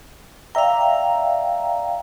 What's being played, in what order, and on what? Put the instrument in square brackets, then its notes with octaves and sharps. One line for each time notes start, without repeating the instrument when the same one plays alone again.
[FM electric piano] D5 E5 A#5 [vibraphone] F5 G5